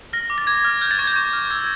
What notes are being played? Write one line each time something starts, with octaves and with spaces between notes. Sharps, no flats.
F6 A#6
D6
A6
D6 G#6
F6
F6 G6
A6
C#6 G#6
G6
C#6
F6
E6 G#6